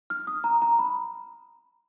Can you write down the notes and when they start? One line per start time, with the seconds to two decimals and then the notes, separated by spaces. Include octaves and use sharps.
0.10 F6
0.27 D#6
0.44 A#5
0.62 A#5
0.79 B5